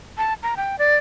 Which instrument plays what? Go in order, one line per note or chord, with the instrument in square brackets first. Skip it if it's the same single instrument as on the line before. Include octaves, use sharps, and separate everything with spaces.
[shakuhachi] A5
A#5
G5
D5